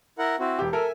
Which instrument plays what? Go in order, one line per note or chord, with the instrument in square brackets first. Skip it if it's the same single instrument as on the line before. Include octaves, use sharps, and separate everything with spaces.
[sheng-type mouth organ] E4 A#4 F#5
C4 E4 F#4
[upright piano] E1 G4
[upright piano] A4 A#4 [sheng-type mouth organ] E5 G#5